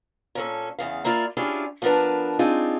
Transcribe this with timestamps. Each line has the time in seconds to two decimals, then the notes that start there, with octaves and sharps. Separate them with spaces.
0.35 A#2 C#4 A4
0.79 E2 C#3 F5
1.05 A#3 E4 F4 D5
1.37 C#4 D4 E4 F4 G4 G#4
1.82 F3 B3 D4 A#4 B4 A5
2.39 C4 D4 D#4 F4 G#4